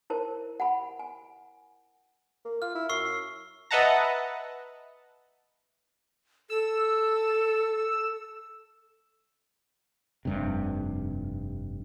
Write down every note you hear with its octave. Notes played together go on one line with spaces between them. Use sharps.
E4 A#4 C5 A5
F#5 G#5 B5
G#5
A#3
F4 F6
E4
F#2 C#6 E6 C7
B4 D#5 E5 F#5 A5 A#5
A4 E6
F1 G2 C3